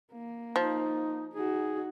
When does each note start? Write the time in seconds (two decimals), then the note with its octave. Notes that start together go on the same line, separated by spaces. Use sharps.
0.12 A#3
0.56 F3 D#4
1.34 D#4 F#4 G#4